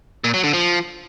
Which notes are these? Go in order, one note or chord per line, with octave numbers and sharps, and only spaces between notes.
A#2
F#3
D3
F3